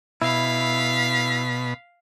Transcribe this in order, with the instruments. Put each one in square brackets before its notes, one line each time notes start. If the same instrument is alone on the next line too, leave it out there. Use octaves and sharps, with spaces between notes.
[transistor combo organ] B2 [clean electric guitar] E4 [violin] F5 B6